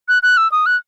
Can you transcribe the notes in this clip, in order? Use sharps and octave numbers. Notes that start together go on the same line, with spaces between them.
F#6
F#6
E6
D#6
F#6